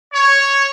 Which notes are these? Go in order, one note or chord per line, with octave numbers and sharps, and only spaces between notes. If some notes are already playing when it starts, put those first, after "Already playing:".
C#5